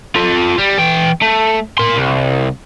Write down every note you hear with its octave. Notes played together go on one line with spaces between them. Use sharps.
F4 A4
G3
E3 G5
A3
A#4 C6
C2